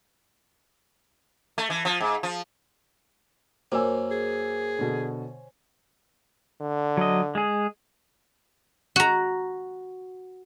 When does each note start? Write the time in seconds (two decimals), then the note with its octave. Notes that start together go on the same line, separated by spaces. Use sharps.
1.58 A3
1.70 E3
1.85 F3
2.01 G#2
2.23 F3
3.72 F#2 A#3 C5 C#5 G#5 D6 E6
4.12 G#4
4.79 B2 D3
6.61 D3
6.97 F#3 D#5
7.35 G#3 G#4
8.96 F#4 A#5